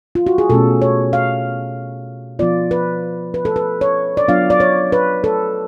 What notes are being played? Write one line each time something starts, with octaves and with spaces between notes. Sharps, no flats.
F4
F#4
G#4
B2 A3 C#4 A4
C#5
F5
F3 B3 F4 D5
B4
B4
A4
B4
C#5
D5
F#3 B3 D4 F4 F5
D5
C#5
B4
A4